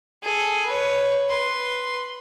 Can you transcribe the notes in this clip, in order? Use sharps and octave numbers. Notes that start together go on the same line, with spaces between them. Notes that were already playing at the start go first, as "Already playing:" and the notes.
G#4 A4
B4 C#5
B4 C6